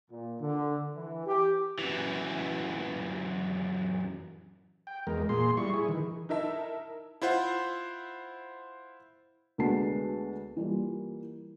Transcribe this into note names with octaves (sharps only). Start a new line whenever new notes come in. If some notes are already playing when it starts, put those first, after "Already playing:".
A#2
D3
E3
G4
F#2 E3
G5
E2 G#3 A#4
A#2 G#4 C6
G3 E4 C#6
E4 G#4
D#3 E3
D#4 E4 A#4 E5 A5
E4 F4 C5 F#5
D2 G#3 B3 F#4 A5 C7
E3 G3 A#3 F4